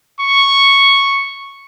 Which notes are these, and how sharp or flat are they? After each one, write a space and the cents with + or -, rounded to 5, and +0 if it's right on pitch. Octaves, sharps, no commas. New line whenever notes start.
C#6 -5